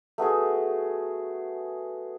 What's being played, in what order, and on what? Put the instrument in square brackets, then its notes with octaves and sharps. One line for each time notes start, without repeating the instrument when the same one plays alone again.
[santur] A3 B3 F#4 G#4